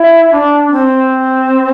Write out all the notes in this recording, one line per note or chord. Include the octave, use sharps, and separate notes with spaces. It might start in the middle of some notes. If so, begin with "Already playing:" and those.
Already playing: E4
D4
C4